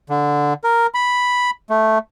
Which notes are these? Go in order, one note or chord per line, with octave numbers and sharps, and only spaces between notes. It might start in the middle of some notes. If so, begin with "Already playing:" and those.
D3
A#4
B5
A3